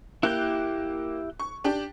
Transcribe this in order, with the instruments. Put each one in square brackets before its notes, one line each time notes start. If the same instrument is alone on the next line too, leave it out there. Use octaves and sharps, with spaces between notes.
[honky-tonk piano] A#3 F#6 [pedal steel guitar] E4 G4 G6
[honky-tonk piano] C#6
D4 G4 G5